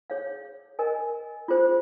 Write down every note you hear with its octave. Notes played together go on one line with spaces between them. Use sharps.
G#4 C#5 F5
A#4 D#5 G#5
F4 G#4 C5